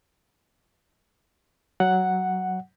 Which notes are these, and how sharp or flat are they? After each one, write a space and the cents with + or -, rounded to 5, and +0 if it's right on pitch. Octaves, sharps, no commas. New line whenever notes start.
F#3 +10 F#5 +0